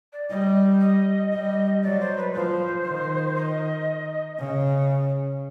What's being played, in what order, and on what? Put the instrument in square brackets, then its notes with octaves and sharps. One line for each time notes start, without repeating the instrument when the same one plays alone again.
[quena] D5
[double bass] G3 [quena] D#5
[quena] D#5
[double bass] G3
[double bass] F#3 [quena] D5
[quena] C5
B4
[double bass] F3 [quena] C5
[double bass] D#3
[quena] D#5
[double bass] C#3